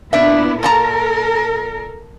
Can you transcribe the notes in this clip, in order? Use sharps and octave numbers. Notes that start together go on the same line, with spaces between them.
A#2 B3 D4 E4 E5
A#2 A4 A#4 A5 A#5